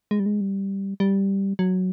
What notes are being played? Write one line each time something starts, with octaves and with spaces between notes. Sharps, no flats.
G#3
G3
G#3
G3
G3
F#3